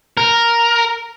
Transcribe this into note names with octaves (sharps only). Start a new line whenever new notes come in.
A#4